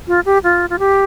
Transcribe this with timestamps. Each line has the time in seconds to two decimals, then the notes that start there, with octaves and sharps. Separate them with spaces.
0.08 F4
0.26 G4
0.44 F4
0.70 F4
0.79 G4